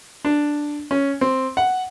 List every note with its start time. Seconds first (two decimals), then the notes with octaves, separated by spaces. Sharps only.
0.25 D4
0.91 C#4
1.21 C4
1.57 F#5